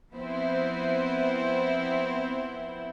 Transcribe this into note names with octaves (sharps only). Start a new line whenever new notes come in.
F3 B3 C4 E4 C5